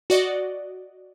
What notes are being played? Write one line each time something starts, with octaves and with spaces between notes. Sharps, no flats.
F#4 D5 D#5